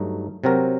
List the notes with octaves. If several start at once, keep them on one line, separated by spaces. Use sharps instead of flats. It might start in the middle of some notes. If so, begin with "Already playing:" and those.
Already playing: G2 F#3 A3 D#4
C3 F#3 C4 F#4 A#4